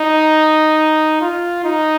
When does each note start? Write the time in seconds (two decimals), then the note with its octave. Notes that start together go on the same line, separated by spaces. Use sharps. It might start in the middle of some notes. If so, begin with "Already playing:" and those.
Already playing: D#4
1.21 F4
1.65 D#4